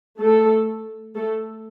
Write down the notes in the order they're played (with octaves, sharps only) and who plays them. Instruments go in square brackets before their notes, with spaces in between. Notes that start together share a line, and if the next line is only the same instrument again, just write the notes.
[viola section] A3 A4
A3 A4